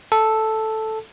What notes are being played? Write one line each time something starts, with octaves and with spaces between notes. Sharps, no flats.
A4